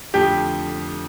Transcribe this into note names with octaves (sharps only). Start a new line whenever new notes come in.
F2 D3 F3 A3 G4